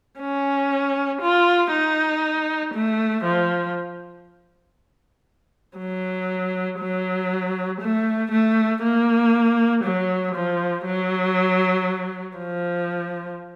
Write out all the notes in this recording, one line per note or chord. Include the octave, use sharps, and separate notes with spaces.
C#4
F4
D#4
A3
F3
F#3
F#3
A3
A3
A#3
F#3
F3
F#3
F3